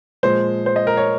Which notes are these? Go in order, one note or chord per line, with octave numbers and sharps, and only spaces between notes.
A#2 F3 G#3 C5
C5
D#5
A#4
C#5